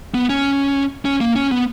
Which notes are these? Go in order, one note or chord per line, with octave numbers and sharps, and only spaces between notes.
B3
C#4
C#4
A#3
C#4
B3